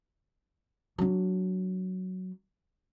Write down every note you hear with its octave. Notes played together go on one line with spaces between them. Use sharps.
F#3 D4